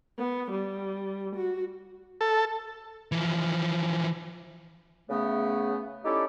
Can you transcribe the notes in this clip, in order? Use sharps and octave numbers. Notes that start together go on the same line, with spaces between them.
B3
G3
F#4
A4
E3 F3
C#3 A3 B3
C#4 D#4 E4 G4 A4 D5